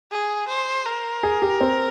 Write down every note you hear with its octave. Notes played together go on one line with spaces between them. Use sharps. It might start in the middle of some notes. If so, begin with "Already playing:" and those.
G#4
C5
A#4
G#4
G4
C4